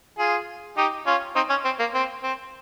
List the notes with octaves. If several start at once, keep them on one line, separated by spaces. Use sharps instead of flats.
F4 G#4
D#4 G4
C#4 F4
C4 D#4
C#4
C4
A#3
C4
C4